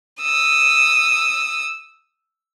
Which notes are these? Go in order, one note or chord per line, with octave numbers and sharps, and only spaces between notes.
D#6 E6